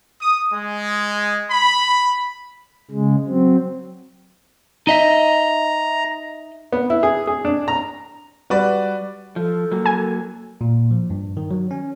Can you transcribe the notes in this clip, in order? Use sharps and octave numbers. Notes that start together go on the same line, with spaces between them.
D#6
G#3
B5
C#3 G#3
F#3 C4
D#4 D#5 E5 A#5
B3
E4
G#4
G#4
D4
A#5
G3 F#4 B4 D5
F3 A4
F#3 A#3
G#5
A#2
F3
G2
D#3
F#3
C#4